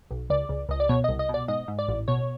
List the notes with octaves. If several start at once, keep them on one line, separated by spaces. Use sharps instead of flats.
B1
C#2 D5
C#2
C#2 D#5
D5
B2 C#5
C2 D#5
D#5
B2
D5
G#2 D#5
G#2
D5
A1
B2 C#5